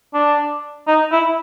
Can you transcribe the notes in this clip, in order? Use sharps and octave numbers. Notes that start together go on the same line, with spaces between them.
D4
D#4
E4